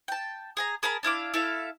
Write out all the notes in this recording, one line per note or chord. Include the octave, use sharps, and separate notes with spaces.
G5 A5
G#4 G#5 A#5
G#4 A#4 A5 B5
D4 E4 F5 D6
E4 A4 E5 F5